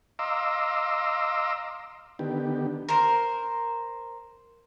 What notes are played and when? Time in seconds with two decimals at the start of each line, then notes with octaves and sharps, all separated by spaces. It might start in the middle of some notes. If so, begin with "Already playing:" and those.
0.19 D#5 F5 A#5 C6 D6 E6
2.19 D3 D#3 B3 G4
2.89 A#4 C5